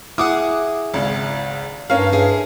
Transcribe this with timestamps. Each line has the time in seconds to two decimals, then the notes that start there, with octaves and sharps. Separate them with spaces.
0.18 E4 G#4 F#5 D6 D#6
0.94 G#1 C#2
1.90 G2 A3 C#4 A#4 F5 G5
2.13 E4 G#4